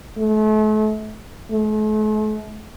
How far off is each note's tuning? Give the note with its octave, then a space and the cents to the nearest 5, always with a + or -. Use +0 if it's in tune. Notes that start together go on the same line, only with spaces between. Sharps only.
A3 -40
A3 -45